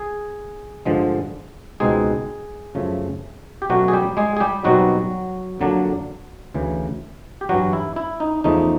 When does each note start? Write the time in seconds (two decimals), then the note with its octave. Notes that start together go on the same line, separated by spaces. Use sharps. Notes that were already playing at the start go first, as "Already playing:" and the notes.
Already playing: G#4
0.85 G2 D3 F3 G#3
1.80 C#2 B2 G#3 C4 D#4 G#4
2.75 F#2 C#3 F3 A3
3.62 G4
3.70 B2 F#3 A3 C#4 F#4
3.88 G#4
3.93 G3 G4
4.17 G#3 G#4
4.37 G#4
4.40 G3 G4
4.64 B2 F#3 G3 C4 D#4 F#4
5.59 F2 D3 F#3 A#3 D4
6.54 D2 C#3 E3
7.41 G4
7.49 G2 E3 F#3 G3 F#4
7.73 E4
7.96 E4
8.20 D#4
8.44 E2 C#3 F3 A3 D#4